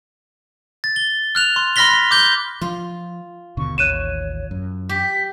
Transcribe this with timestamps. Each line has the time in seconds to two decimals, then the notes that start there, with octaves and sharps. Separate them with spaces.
0.84 A6
0.96 G7
1.35 F6 F#6 F7
1.56 C6
1.76 B5 C6 F6 A#6 B6 G7
2.11 D6 G6 G7
2.61 F3 F4
3.57 D#2 B2 D3 C#6
3.78 A1 D#2 C#5 F#6 D#7 E7
4.51 F#2
4.89 G4 B6